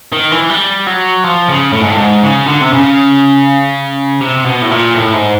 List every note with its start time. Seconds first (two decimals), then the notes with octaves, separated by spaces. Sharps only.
0.13 D#3
0.32 E3
0.50 G3
0.87 F#3
1.24 F3
1.49 C#3
1.73 A2
1.81 G#2
1.90 A2
1.98 G#2
2.23 C#3
2.47 D3
2.61 C3
2.73 C#3
4.21 C3
4.45 B2
4.62 A2
4.71 A#2
4.94 A2
5.13 G#2